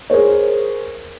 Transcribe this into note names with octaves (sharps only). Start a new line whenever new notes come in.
G#4 A#4 C5 C#5